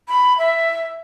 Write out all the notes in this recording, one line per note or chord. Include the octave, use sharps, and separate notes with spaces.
B5
E5